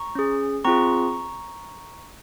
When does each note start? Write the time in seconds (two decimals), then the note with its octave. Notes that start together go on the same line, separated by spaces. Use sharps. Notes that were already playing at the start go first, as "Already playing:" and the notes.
Already playing: A#5 C#6
0.15 C#4 G#4
0.65 C4 F4 G#4 A#5 C#6